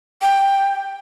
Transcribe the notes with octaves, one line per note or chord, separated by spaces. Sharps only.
G5